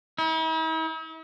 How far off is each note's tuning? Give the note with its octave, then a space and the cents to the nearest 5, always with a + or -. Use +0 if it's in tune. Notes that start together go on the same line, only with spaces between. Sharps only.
E4 -45